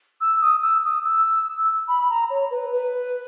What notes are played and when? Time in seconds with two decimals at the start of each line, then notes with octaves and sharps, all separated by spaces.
0.21 E6
0.41 D#6
0.63 E6
0.84 D#6
1.05 E6
1.88 B5
2.10 A#5
2.30 C#5
2.51 B4
2.73 B4